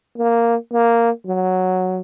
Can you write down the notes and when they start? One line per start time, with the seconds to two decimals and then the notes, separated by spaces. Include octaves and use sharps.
0.17 A#3
0.72 A#3
1.26 F#3